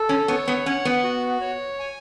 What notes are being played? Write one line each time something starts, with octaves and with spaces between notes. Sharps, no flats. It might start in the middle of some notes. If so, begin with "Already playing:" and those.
Already playing: A4
C#4
B3 C#5
B3
C#4 F#5
B3
F#4
C#5
G#5